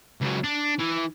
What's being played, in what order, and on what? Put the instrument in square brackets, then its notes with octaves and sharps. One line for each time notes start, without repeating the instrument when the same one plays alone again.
[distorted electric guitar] C#2 F#3
D4
E3